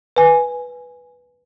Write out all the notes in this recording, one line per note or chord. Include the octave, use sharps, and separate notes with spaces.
B4 G#5